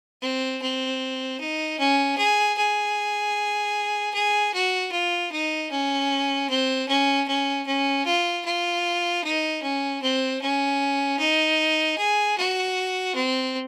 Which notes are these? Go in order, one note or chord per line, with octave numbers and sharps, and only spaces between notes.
C4
C4
D#4
C#4
G#4
G#4
G#4
F#4
F4
D#4
C#4
C4
C#4
C#4
C#4
F4
F4
D#4
C#4
C4
C#4
D#4
G#4
F#4
C4